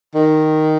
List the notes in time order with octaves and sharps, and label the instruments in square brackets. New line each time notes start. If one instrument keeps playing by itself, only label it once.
[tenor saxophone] D#3